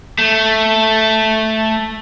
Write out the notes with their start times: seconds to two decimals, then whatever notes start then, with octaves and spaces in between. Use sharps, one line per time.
0.18 A3